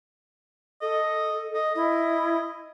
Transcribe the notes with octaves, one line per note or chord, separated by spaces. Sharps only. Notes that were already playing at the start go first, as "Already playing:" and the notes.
A4 D#5
D#5
E4 D#5